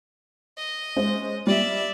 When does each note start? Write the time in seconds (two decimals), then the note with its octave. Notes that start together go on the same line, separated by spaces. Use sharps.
0.58 D#5
0.96 G#3 C#4 C5
1.47 G3 D5 E5